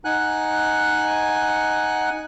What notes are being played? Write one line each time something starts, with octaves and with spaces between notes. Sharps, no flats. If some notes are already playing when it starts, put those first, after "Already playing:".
D#4 F#5 G#5 F#6